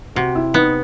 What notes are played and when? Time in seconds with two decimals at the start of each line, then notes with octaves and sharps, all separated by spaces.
0.16 C3 F#4
0.35 E4
0.54 B3 D#4